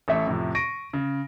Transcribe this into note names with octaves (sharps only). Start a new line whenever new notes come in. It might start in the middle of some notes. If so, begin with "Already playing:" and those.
A1 A3 E5
F2 A2 C3
C#6 A#6 D7 D#7
C#3